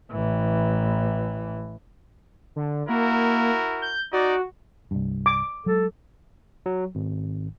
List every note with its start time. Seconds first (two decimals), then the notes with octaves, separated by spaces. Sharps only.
0.12 A1 E3
2.56 D3
2.89 A#3 E4 F#4 A#4
3.82 G6
4.13 D#4 F#4 D5
4.91 C2 G2
5.26 D6
5.66 F#3 G#3 A4
6.66 F#3
6.95 G#1